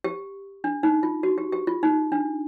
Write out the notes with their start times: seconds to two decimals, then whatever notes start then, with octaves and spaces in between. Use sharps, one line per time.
0.04 G4
0.64 D4
0.83 D#4
1.03 F4
1.23 F#4
1.38 G4
1.52 G4
1.67 F4
1.83 D#4
2.12 D4